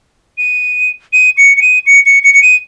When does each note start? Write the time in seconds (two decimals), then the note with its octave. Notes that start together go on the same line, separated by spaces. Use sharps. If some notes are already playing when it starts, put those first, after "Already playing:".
0.38 D#7
1.13 D#7
1.37 C#7
1.57 C#7
1.62 D#7
1.86 C#7
2.06 C#7
2.24 C#7
2.34 C#7
2.42 D#7